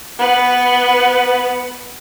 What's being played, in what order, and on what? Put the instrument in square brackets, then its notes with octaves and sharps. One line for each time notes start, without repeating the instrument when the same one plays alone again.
[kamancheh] B3 B4